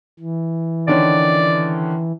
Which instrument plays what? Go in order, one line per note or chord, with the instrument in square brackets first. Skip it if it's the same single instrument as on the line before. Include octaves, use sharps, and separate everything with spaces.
[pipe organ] E3
[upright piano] D3 D#3 C#4 [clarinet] D5